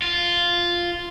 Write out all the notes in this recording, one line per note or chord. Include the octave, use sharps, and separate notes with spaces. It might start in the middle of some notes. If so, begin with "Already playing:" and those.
F4